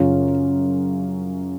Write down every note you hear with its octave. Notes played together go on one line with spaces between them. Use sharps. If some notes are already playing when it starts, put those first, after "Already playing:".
Already playing: F#2 C#3 C#4 F4